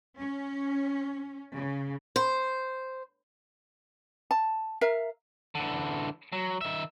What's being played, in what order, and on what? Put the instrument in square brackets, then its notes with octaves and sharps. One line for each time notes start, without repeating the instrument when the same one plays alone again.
[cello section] C#4
C#3
[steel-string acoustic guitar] C5
[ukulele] A5
A#4 E5 F5
[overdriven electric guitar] D3 E3
F#3
D#3 E5